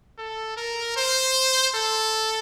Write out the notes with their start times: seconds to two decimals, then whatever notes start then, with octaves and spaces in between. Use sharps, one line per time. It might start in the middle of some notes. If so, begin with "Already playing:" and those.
0.18 A4
0.57 A#4
0.96 C5
1.75 A4